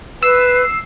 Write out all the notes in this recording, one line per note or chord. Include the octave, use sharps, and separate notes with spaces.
B4 E6 C7